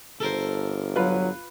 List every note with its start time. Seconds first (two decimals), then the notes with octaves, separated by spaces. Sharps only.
0.20 G1 A4 A#4 C5
0.96 F#3 F4 B4